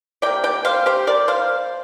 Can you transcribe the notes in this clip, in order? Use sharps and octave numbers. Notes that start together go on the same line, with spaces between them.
C3 A#3 D5 G5
D5 G5
C5 F5
G4 C5
A#4 D5
C5 F5